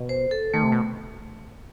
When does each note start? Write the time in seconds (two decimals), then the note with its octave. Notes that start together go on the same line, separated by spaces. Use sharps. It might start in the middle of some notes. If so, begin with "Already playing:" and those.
Already playing: B2
0.09 C5
0.31 A4
0.54 D#3 A3
0.63 C3
0.72 B2